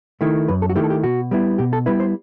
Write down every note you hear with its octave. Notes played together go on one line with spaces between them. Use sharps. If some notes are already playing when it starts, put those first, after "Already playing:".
D#3 A3 E4
F#2 B4
A4
F#4
D#3 A3 E4 G4
A4
G4
B2 F#4
G3 B3 E4
B2 G4
A4
G3 B3 E4 B4
C5